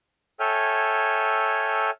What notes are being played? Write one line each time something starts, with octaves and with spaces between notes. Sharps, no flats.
A4 C#5 E5 G5 G#5 F6